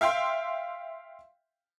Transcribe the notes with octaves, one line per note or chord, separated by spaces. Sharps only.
E5 F5 G5 C6